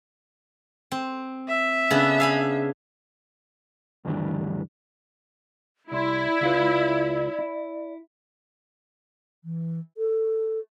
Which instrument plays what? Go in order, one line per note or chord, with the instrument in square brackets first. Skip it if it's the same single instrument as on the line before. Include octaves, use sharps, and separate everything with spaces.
[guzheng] C4
[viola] E5
[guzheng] C#3 B3 D4
F5 G#5 B5
[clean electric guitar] D2 G2 D#3 E3 G3 D4
[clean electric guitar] C2 C6 [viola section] E4 [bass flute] D5
[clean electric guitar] C#2 F4 B4
E4
[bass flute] E3
A4